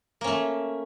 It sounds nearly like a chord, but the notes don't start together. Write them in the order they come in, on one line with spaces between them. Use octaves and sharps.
A#3 C#4 A3